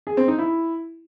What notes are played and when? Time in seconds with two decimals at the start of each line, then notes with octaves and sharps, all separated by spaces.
0.07 G#4
0.17 C4
0.28 D#4
0.38 E4